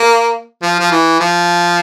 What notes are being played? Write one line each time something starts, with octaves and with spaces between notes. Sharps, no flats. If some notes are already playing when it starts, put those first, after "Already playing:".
Already playing: A#3
F3
F3
E3
F3